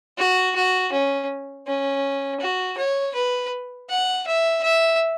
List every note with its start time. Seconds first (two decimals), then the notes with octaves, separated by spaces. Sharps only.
0.18 F#4
0.55 F#4
0.92 C#4
1.67 C#4
2.40 F#4
2.78 C#5
3.15 B4
3.90 F#5
4.26 E5
4.63 E5